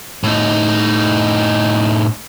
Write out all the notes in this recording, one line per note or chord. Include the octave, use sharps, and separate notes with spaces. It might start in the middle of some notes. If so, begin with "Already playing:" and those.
A2 D#4